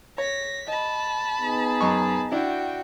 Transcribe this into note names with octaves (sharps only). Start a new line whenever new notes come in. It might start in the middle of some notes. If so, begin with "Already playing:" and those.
C#5 A#6 B6
D#5 A5 B5
B3 D#4 G#4
F#2 D#5 C#6
D4 E4 F#4 G5